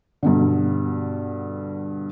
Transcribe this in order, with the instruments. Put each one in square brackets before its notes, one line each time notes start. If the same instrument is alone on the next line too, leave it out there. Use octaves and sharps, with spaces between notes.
[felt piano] G2 B2 D3